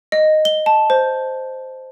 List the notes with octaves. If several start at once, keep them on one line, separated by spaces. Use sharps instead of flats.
D#5
G7
A5
C5